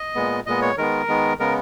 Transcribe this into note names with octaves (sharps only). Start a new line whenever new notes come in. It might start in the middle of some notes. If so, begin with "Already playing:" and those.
Already playing: D#5
A#2 G#3 B3
A#2 G#3 B3 D#5
C#5
D#3 G#3 B3 A#4
D#3 G#3 B3
C#3 G#3 B3 A#4